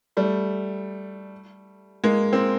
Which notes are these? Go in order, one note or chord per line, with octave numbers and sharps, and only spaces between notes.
G3 A3
G#3 A#3
A#3 C4